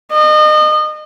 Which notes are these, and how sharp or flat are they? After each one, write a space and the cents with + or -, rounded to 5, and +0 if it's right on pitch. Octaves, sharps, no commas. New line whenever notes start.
D#5 -30